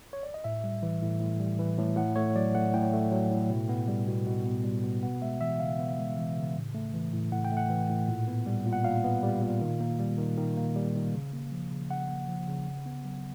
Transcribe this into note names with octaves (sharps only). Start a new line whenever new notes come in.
C#5
D5
D#5
A2 E5
G3
E3
A2
A2
G3
E3
A2
A2 F#5
A3 C#5
F#3 D5
A2 F#5
A2 G5
A3
F#3
A2
B2
B3
G3
B2
B2
B3
G3
B2
B3 F#5
G#3 E5
E3 E5
C#3 F5
B3
G#3
E3
C#3
A2
A3
E3
A2
A2 F#5
G5
A3
F#5
E3
A2
A#2
B3
G3
A#2
F#5
A#2 F5
B3
G3
A#2
D#3
A#3
G3
D#3
D#3
A#3
G3
D#3
C#3
A#3
F3
C#3
C#3 F#5
A#3
F3
C#3
C#3
B3
F#3